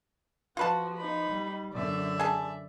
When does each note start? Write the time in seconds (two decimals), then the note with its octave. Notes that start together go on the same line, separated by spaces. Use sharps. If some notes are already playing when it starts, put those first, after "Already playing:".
0.57 F3 F4 F#4 B4 A5
0.96 D#4 B5
1.30 G3
1.74 F#2 D3 D5 E5
2.20 G#4 A5